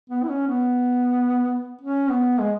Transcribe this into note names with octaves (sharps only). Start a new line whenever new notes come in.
B3
E4
C#4
B3
C#4
B3
G#3